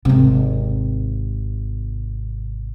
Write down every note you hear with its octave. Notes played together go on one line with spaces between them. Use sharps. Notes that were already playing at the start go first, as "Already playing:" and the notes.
G#1 C3